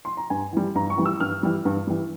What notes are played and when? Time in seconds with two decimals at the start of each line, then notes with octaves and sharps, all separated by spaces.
0.05 C6
0.17 A#5
0.30 G2 G#5
0.53 E3 G3
0.75 G2 A#5
0.90 C#6
0.98 E3 G3
1.05 E6
1.20 G2 F6
1.43 E3 G3
1.65 G2
1.87 E3 G3